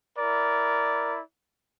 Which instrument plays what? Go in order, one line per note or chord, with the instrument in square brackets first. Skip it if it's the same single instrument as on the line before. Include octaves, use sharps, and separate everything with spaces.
[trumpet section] E4 A#4 D5